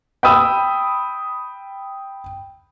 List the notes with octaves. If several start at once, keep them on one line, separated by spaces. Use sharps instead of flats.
G5 B5 D#6 E6